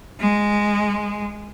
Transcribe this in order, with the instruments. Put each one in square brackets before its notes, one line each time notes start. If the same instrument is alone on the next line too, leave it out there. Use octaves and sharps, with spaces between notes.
[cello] G#3